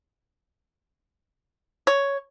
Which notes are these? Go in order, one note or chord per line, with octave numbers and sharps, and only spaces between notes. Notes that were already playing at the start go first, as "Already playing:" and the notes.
C#5